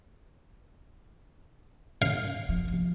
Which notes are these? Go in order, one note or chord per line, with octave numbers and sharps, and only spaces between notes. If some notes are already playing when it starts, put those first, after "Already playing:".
F5
F3